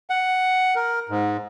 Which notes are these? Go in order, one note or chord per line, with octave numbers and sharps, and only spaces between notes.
F#5
A#4
G#2